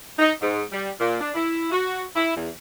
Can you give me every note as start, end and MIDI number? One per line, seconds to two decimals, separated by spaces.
0.19 0.33 63
0.42 0.63 44
0.72 0.90 55
1.00 1.18 46
1.21 1.30 62
1.35 1.71 64
1.72 2.02 66
2.16 2.36 64
2.37 2.50 40